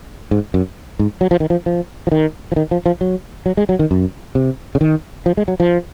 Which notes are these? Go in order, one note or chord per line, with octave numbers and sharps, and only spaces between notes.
G#2
F#2
G#2
F#3
F3
D#3
F3
F3
F3
D#3
F3
D#3
F3
F3
F#3
F#3
G#3
F#3
D#3
F#2
C3
C#3
D#3
F3
G#3
F#3
F3